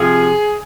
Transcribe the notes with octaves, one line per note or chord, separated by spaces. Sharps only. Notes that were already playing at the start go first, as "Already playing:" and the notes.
Already playing: C3 F3 G#4